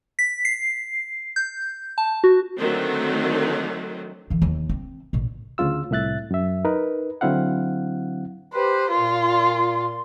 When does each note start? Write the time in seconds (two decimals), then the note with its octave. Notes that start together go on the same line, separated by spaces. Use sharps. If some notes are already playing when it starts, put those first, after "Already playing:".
0.19 B6
0.45 C7
1.36 G6
1.98 A5
2.24 F#4
2.58 D3 D#3 F#3 A3 C4
4.30 D3 E3
4.42 D#2
4.69 C4
5.13 A1 A#2
5.58 D2 C#3 F4 E6
5.91 C2 A2 E5 F#6 A6
6.31 F#2 E5
6.65 D#4 A#4 B4
7.21 D3 F#3 C4 E4 F5 F#5
8.54 G4 B4 C5
8.91 A#2 F4 C6